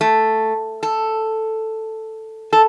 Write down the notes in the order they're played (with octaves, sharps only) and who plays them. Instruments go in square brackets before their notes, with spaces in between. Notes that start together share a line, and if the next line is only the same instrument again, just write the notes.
[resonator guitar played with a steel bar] A3
A4
A4